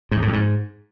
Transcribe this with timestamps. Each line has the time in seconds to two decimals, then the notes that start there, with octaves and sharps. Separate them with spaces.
0.11 G#2
0.17 E2
0.22 A2
0.28 F2
0.33 G#2